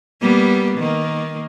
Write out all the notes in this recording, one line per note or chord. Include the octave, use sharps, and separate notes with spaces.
G3 A#3 B3
D#3 A#3